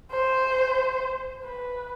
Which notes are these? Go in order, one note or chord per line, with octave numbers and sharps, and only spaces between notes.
C5
B4